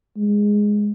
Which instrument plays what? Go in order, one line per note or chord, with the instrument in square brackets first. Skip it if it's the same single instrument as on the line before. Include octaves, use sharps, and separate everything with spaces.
[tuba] G#3